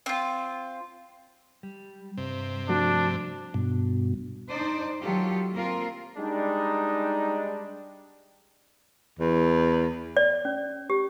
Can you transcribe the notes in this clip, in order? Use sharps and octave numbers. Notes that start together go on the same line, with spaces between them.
C4 F4
G3
G2 C3
F3 A3 D4 F#4
G2 B2
D4 D#4 C5 D5
D#3 F#3 F4 G4 A4
A#3 C4 F4 A#4
G3 G#3 D4 D#4
E2
D5
C#4
G4